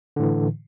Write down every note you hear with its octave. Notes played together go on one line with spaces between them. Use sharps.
A2 D3 E3